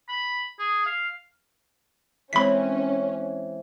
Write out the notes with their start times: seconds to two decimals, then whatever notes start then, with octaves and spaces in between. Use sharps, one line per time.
0.09 B5
0.59 G#4
0.86 F5
2.33 E3 G#3 C4 C#4 B5 B6